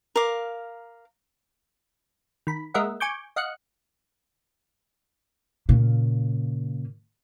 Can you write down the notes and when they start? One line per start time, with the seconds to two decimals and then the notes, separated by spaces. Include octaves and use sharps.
0.16 A#4 F5 D6
2.47 D#3 B5
2.74 G#3 A#3 A#4 D#5 E5 F#5
3.00 G#5 C#6 D6 G6
3.36 D#5 F5 F#5 F#6 C#7
5.69 A#2 C#3